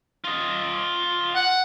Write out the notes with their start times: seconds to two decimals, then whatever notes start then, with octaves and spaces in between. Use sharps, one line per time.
0.24 F4 D#5
1.35 F#5